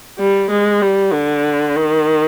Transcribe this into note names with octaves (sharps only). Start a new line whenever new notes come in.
G3
G#3
G3
D3
D#3